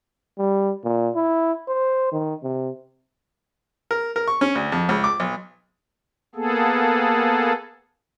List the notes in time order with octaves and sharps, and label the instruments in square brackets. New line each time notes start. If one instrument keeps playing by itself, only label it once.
[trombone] G3
A#2
E4
C5
D#3
C3
[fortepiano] A#4
A#4
C#6
C#4
D2
F2
C#2
D6
B1
[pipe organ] A#3 B3 G#4 A4